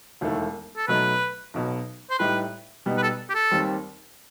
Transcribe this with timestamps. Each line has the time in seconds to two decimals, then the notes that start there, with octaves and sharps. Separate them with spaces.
0.21 E1 D#2 D#3 A3 E4
0.77 A4
0.88 B2 F#3 A3 D#4 B4
1.54 B1 B2 F#3
2.10 C5
2.19 A2 G3 D#4 G4 B4
2.86 B2 G3 B3 D#4
2.98 B4
3.03 A4
3.30 G4
3.35 A4
3.51 D#2 D#3 G3 C4